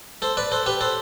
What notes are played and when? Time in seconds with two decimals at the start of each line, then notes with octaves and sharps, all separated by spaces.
0.22 A4 C5
0.37 B4 D5
0.52 A4 C5
0.66 G4 B4
0.81 A4 C5